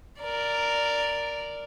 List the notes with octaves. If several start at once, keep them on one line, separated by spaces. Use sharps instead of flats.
A#4 D5